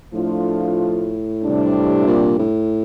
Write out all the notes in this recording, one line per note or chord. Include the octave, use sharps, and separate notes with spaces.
A2 F3 A3 D4 F4
C3 G3 D4
A#2
A2